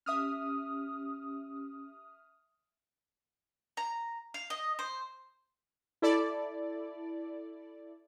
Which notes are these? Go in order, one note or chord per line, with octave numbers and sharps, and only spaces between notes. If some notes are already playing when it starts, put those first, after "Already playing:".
C#4 G4 E5 D#6 F6
A#5
F5
D#5
C5
E4 A4 D5